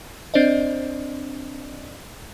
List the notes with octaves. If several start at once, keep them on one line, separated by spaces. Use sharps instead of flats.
C4 D4 C5 D5 D#5